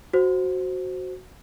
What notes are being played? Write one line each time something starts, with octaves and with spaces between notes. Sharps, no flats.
F#4 C5